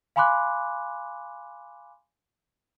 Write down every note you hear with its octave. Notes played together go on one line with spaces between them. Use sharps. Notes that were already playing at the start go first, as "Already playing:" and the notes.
F5 G#5 B5 C6 D6 F#6